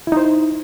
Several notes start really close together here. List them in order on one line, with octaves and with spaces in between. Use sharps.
E4 D#4 C5